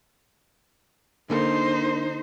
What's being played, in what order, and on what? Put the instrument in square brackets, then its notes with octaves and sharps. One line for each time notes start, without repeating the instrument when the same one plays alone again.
[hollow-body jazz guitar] D3 A#3 A4 [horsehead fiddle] D#4 C5